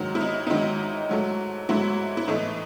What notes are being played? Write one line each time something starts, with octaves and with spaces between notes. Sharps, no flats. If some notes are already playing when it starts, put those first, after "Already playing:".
Already playing: G#2 D#3 F#3
E4
D#4
D#4
G#2 D#3 F#3 E4
G#2 F#3 A3
G#2 F#3 A3 E4
E4
A2 E3 A3 D#4